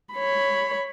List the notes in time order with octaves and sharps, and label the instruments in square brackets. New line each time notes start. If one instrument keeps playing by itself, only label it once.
[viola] C#5 B5